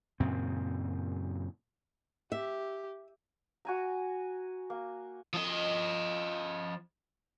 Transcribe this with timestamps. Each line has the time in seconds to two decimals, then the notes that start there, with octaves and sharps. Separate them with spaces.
0.20 F#2 A#2 C#3 C4
2.32 G4 E5
3.65 F#4 G#5 A#5
4.70 A#3
5.33 F3 D#5